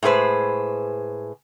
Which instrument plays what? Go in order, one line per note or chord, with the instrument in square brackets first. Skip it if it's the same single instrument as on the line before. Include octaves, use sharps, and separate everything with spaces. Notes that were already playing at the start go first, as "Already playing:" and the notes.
[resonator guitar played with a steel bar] A2 G#3 G#4 B4 C5